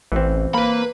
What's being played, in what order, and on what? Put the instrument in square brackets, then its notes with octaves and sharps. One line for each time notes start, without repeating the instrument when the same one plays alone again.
[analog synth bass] A1 [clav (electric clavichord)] E3 C4
[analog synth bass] A#3 [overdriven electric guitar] B4 B5